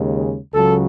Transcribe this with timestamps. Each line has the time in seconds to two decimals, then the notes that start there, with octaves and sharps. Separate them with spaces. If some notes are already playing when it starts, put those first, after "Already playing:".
Already playing: D#2 C#3 G#3
0.54 C#2 C#3 F#3 A4